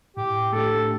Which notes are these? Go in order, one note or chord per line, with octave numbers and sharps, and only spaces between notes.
A2 G4
A3 D4 G4 A4